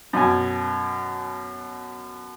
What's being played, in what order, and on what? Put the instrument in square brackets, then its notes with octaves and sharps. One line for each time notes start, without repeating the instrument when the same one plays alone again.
[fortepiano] F#2 B2 G#5